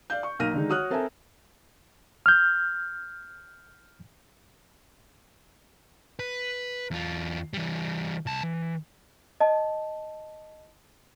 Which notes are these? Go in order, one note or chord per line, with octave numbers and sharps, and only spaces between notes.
D5 F5 G6
C#6
B1 A#3 A#4 F6 A#6 D#7
D3 D#3 G#3 D#4
F#4 C#5 D#6 F6 F#6
C4 A4 A#4 E5 G#5 A5
F6 G6
B4
E2 F4
E3 G3
C2 A5
E3
D#5 A5